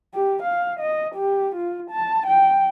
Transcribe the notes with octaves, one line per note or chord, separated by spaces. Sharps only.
G4
F5
D#5
G4
F4
A5
G5